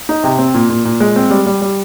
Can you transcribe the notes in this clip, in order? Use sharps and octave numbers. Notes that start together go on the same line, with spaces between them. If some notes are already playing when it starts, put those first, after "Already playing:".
D#4
C3
C4
A#2
A#2
A#2
G#3
C4
G3
G3
G3